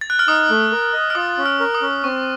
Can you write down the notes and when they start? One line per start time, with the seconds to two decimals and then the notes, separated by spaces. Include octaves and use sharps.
0.01 A6
0.10 F#6
0.19 F6
0.28 D#4 D#6
0.50 A3
0.72 A#4
0.93 D#5
1.10 F6
1.15 F4 D#6
1.38 C#4
1.46 F6
1.60 A#4
1.75 D#6
1.82 C#4
2.04 C4 C#6